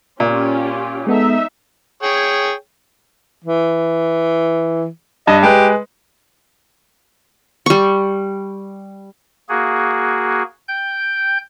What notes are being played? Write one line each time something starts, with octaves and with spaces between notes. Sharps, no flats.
A#2 C#4 F4 G4
G#3 B3 D#4 A4 E5
G#4 C#5 G5
E3
G2 D#5
G#3 G4 B4
G3 C#6
A#3 F#4 G#4
G5 G6